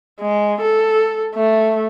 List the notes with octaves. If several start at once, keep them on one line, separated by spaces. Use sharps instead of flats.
G#3
A4
A3